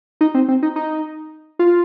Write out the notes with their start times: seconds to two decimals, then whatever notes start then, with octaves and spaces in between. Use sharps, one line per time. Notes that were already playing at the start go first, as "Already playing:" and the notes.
0.21 D#4
0.35 C4
0.48 C4
0.63 D#4
0.76 D#4
1.59 F4